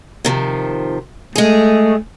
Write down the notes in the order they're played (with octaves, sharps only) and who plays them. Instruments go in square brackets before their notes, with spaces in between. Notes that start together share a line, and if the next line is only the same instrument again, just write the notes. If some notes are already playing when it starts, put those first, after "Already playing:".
[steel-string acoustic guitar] C3 D#3 F3
[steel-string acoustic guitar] G#3 G#4 [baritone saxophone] A3